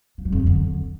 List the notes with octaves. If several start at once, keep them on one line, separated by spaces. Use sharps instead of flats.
F3
F#3
F2
F#3
D3